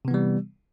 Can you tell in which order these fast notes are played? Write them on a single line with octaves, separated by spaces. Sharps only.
C3 B3 E3 G3